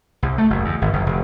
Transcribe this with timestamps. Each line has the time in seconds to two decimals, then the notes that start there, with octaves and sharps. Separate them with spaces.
0.22 C2
0.38 A3
0.50 F#1
0.65 E2
0.82 G#1
0.93 F#1
1.06 F1